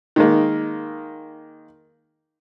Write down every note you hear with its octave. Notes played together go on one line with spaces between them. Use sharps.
D#3 G#3 A#3